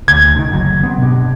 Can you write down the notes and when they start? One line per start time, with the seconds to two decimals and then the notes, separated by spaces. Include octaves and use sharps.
0.08 D2 G#6
0.36 D3 D#3
0.51 F#1 F#3
0.83 B3 C4
0.98 G2 B2